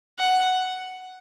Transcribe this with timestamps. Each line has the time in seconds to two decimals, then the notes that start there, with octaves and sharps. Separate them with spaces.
0.19 F#5